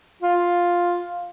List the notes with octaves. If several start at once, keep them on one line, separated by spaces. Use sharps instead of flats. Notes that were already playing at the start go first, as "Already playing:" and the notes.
F4